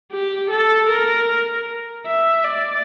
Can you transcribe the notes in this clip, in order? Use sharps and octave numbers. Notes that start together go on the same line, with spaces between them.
G4
A4
A#4
E5
D5